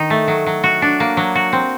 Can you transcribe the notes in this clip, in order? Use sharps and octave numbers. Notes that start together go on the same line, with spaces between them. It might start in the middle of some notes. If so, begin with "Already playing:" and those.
Already playing: D#3 D#4
A3
F#3
F#3
F#4
D4
A#3
F#3
F#4
C4